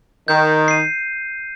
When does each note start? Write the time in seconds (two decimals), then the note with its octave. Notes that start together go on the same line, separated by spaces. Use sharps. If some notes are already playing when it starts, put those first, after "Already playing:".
0.28 D#3 G6
0.68 C7 D#7